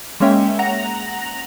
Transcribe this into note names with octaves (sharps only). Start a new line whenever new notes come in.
G#3 A#3 C#4 C#5 E5 G5
F#5 A#5 A#6 F7